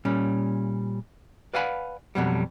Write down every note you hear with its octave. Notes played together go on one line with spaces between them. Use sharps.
A#2 G3 C#4
B4 D5 F5 F#5 G#5 B5
F2 B2 F#3 G3